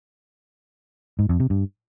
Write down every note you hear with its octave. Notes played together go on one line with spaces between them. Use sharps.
G#2
F2
C3
G2